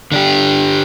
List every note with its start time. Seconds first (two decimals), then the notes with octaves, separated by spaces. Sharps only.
0.12 D3 D4 G4